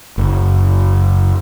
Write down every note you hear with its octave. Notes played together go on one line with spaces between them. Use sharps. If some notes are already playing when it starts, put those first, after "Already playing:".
F#1